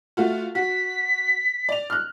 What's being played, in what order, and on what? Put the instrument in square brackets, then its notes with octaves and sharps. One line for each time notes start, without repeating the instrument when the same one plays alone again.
[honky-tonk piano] A3 F4 F#4
[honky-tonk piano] F#4 [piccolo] B6
[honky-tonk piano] D5 F7
F6 F#6